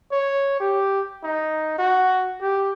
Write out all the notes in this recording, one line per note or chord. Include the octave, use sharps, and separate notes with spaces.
C#5
G4
D#4
F#4
G4